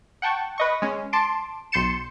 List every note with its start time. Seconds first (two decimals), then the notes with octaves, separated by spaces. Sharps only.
0.22 F#5 G5 A5 C#6
0.58 B4 D#5 C#6
0.82 G#3 C#4
1.13 A5 C6 D6
1.72 B1 C6 G6 A6 C#7 E7